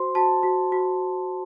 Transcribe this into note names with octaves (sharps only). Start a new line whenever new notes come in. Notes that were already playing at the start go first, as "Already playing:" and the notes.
Already playing: F#4 C5 C6
F#4 A5
F#4
F#4